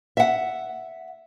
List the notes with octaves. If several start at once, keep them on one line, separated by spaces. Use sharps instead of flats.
E5 F#5